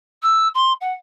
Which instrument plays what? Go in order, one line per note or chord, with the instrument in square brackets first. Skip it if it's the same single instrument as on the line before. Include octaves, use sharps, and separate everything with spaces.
[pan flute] E6
C6
F#5